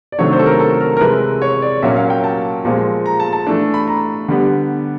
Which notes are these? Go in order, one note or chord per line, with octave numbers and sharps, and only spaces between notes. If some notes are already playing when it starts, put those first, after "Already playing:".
D5
C3 D#3 F#3 A3 D4 C#5
C5
A4
A#4
A4
A#4
A#4
C3 E3 G#3 B4
C#5
D5
A#2 F#3 A#3 C#4 E5
F5
G5
A5
A#2 F3 G#3
A#5
A5
A5
E3 A3 D4
B5
A#5
D3 G3 B3